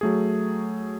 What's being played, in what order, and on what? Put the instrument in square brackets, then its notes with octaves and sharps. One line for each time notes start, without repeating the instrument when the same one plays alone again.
[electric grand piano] F#3 A3 G#4